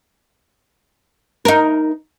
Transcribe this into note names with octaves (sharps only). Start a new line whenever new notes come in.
D#4 A#4